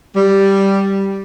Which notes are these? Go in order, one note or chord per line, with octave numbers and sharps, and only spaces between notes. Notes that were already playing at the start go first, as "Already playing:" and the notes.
G3